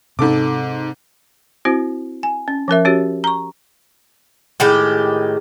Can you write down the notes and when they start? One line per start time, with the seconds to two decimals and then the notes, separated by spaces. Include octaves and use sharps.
0.19 G#2 C3 A4 D6
1.65 C4 E4 F#4 C5
2.23 G#5
2.48 C#4
2.68 F3 C#4 A#4 E5
2.85 C#4 F#4 G4 C#5
3.24 A#5 C#6
4.60 A2 D#3 G#3 G4